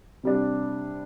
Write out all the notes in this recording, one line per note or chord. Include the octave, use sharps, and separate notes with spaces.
C3 G3 D4